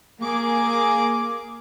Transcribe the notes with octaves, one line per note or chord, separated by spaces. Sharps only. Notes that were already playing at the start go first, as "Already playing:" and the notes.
A#3 G#4 D6